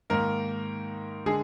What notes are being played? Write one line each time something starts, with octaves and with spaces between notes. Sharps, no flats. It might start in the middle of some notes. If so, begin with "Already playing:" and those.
G#2 D#3 A#3 A#4
D3 G#3 G#4